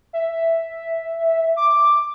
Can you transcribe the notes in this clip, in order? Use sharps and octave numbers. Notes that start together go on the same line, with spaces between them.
E5
D6